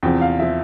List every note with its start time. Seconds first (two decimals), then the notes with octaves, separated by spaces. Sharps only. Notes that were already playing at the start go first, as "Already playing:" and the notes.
0.03 E2 C3 F3 G5
0.21 F5
0.39 C3 F3 E5